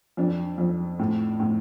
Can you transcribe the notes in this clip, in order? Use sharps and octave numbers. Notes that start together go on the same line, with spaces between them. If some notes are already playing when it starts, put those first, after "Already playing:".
F2 D4
F2
A2
A2